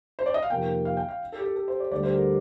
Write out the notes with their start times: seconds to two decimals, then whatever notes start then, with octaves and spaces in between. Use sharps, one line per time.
0.19 C5
0.26 D5
0.34 D#5
0.43 F5
0.50 F2 C3 D#3 A#3 G5
0.85 F5
0.97 G5
1.09 F5
1.32 A4
1.39 G4
1.45 A4
1.56 A4
1.68 C5
1.80 D5
1.91 D2 D3 G3 D5
2.04 C5
2.15 A#4